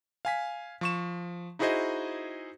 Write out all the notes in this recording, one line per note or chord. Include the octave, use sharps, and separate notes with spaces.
F5 G#5 B6
F3 C#6 E7
D#4 E4 F#4 G#4 C5 D#5